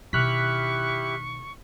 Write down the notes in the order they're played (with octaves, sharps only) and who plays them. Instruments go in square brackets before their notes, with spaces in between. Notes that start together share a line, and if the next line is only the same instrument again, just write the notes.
[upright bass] B2 D#3 [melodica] E4 G4 [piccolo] C#6 [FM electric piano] F6 F#6 B6